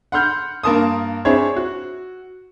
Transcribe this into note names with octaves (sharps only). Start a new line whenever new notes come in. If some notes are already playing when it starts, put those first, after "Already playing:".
F#5 B5 C6 F6 G6
G2 A#3 A#4 A5 C6 D#6
C4 D4 E4 G#4 C#5
F#4